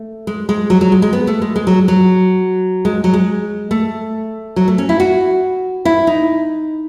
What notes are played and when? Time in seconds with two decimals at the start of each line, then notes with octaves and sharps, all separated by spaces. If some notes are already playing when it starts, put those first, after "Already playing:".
Already playing: A3
0.27 G#3
0.49 G#3
0.70 F#3
0.81 F#3
0.92 G#3
1.02 G#3
1.13 B3
1.27 A3
1.42 G#3
1.56 G#3
1.67 F#3
1.88 F#3
2.85 G#3
3.04 F#3
3.14 G#3
3.71 A3
4.56 F#3
4.68 A3
4.78 C#4
4.89 E4
5.00 F#4
5.85 E4
6.07 D#4